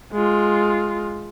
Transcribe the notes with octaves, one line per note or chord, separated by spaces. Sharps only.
G#3 F4